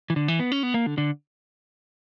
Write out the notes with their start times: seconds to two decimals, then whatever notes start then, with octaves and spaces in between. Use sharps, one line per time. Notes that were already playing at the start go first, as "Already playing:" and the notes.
0.10 E3
0.16 D3
0.28 E3
0.40 B3
0.52 C#4
0.63 B3
0.74 A#3
0.86 D3
0.98 D3